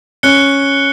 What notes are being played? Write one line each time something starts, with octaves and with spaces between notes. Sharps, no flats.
C#4 F#6 C#7 G7